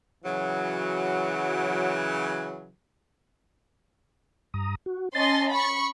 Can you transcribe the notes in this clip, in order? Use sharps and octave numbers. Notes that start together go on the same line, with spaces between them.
C#3 E3 F#3
G2 A#5 D#6
F#4
C#4 D#5 A5 C6 A6
B5 C#6